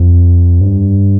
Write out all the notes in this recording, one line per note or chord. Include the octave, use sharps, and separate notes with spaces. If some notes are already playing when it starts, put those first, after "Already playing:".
Already playing: F2
G2